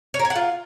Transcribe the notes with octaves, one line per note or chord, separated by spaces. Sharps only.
C#5
A#4
G#5
F#5
F4